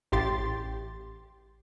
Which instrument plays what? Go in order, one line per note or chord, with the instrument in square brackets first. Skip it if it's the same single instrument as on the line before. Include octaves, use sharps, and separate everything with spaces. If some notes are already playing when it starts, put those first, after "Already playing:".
[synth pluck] A1 G4 C6 A6